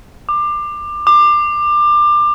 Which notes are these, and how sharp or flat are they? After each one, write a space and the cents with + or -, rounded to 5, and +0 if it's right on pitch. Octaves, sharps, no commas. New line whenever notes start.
D6 +25
D6 +25